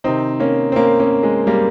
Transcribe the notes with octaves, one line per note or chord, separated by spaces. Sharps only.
C3 D#3 C4 D#4
A#3 C#4
C4
A#3 C#4
A#3 C#4
G#3
G3 A#3